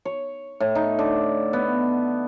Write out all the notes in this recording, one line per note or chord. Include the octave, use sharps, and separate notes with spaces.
C#5
A2
D#4
D3
B3